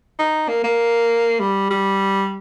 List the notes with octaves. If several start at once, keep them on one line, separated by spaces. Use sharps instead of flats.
D#4
A#3
A#3
G3
G3